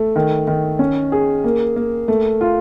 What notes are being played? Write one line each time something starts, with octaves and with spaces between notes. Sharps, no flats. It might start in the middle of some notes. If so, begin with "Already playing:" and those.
Already playing: A3
D#3
D#3
C#4
G#4
A#3
A#3
A3
F4